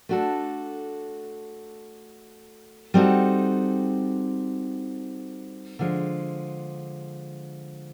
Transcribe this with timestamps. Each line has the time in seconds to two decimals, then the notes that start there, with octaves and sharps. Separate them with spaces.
0.09 A3 D4 F#4 A4
2.94 G3 C4 D#4 F#4 A4
5.79 D3 F3 G#3